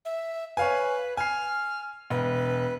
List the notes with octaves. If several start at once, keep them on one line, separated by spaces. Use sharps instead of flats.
E5
B4 C#5 F5 G#5
G#5 F6 C7
E1 B4